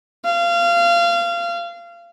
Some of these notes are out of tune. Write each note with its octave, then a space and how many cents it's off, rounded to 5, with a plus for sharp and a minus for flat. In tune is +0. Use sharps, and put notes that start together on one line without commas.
F5 -25